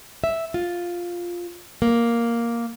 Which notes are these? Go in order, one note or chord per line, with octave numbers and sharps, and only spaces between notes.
E5
F4
A#3